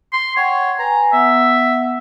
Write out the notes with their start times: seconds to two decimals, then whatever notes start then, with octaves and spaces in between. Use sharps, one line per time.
0.13 C6
0.36 C#5 F#5 G5
0.79 B4 G#5 A#5
1.13 B3 E5 F#5